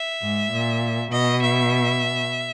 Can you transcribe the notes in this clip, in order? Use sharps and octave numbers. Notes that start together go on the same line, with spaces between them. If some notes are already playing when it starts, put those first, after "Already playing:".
Already playing: E5
G#2
A#2
B2 D#5
E5